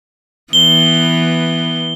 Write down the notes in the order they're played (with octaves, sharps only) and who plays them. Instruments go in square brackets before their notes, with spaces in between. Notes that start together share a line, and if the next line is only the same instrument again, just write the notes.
[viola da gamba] E3 B3 [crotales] G7